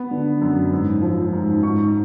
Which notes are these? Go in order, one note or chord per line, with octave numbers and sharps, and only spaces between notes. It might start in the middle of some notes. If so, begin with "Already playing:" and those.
Already playing: B3
D3
F#2
G#2
F3
G#2
G#2 C#6